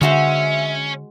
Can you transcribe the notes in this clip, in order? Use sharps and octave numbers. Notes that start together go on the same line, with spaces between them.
D3 G#3 C#4 F#4 C5 E5